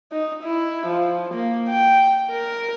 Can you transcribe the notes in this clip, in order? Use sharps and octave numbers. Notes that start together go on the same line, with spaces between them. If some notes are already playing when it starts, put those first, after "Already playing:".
D#4
E4
F3
A#3
G5
A#4